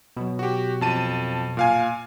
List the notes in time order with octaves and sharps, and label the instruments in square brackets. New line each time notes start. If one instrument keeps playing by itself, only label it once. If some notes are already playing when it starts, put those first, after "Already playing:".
[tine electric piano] B2 F#3
[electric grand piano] F#4 G4
F2 A5 D#7
A#2 F5 G#5